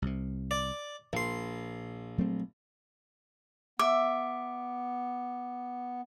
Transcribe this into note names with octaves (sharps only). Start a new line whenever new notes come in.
C2 C3
D5
A#1 A#2 C6
F#3 A3 C4
B3 E5 D6